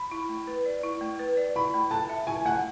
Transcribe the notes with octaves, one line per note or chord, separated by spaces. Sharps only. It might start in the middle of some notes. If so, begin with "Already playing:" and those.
Already playing: B5
E4
A3
B4
D5
E4
A3
B4
D5
E4 B5
A3
A4 A5
E5
E4 G#5
A3 F#5